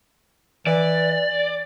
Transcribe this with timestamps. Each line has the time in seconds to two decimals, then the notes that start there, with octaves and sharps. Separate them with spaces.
0.67 E3 D5